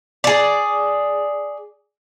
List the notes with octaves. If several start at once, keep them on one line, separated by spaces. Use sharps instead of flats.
G#4 D5